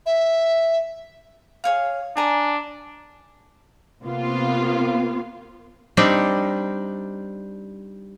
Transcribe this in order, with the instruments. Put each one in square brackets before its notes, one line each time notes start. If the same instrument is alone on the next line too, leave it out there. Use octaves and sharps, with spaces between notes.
[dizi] E5
[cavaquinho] G#4 C#5 F5
[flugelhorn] D4 [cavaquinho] G#5 A#5
[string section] C3 A#3 B3 F4
[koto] G3 C4 D4 D#4